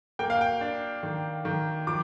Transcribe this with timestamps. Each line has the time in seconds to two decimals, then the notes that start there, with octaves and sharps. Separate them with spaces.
0.19 A#3 G5
0.30 F5
0.41 G5
0.61 D4
1.03 D#3
1.45 D#3
1.87 F3 D6